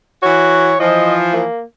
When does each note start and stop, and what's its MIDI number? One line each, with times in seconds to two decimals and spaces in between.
0.23 0.72 52
0.23 0.72 66
0.23 0.76 73
0.80 1.42 52
0.80 1.42 53
0.80 1.14 75
1.33 1.62 58